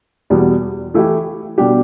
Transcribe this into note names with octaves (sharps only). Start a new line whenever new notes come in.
E2 B2 G3
E3 A3 E4 G4
B2 G3 D4 G4